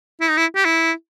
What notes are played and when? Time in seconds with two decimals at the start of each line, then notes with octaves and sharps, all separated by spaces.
0.20 E4
0.29 D#4
0.37 E4
0.56 G4
0.65 E4